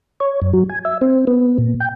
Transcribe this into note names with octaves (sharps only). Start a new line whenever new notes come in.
C#5
F#2
F#3
G#5
E5
C4
B3
A#2
G5